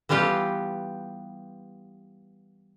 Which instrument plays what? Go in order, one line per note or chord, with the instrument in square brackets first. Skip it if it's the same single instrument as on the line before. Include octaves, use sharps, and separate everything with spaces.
[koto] E3 G3 B3 F4 G4